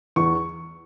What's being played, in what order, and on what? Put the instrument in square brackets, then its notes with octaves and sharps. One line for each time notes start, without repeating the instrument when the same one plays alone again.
[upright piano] E2 C#6